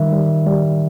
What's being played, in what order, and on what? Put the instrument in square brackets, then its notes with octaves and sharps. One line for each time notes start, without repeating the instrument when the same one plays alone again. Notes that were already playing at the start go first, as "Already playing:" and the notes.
Already playing: [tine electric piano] D#3 G3 E5
G3
G3